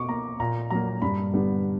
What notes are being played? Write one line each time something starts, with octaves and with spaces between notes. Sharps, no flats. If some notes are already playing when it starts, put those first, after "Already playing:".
Already playing: B2 C#6 D6
A#3 A#5
A#2 A#5
F#3 A#3 A#5
G2 B5
D3 G3 B3